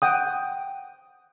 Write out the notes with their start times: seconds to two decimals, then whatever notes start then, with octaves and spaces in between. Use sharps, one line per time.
0.02 F#5 G5 D#6